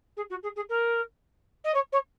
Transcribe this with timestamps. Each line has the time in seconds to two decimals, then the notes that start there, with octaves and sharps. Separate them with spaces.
0.17 G#4
0.30 F#4
0.43 G#4
0.56 G#4
0.69 A#4
1.64 D#5
1.74 C#5
1.92 C#5